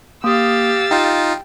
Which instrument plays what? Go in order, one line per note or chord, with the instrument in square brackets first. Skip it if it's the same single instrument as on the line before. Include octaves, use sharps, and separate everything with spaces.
[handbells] A#3 D#6 [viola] G4 F5 [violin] E6 A6
[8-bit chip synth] D#4 F4 [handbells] G5